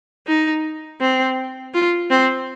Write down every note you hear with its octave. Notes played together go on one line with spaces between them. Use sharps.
D#4
C4
F4
C4